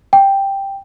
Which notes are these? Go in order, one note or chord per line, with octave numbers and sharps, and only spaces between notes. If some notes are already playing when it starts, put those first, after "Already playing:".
G5